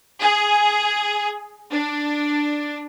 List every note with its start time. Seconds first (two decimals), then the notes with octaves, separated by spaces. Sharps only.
0.21 G#4
1.72 D4